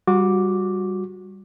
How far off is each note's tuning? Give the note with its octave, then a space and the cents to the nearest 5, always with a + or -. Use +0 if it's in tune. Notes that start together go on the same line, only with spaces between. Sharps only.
G3 +0 F#4 -25 D6 +0